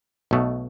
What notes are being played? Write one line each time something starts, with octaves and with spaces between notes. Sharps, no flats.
B1 B2 A3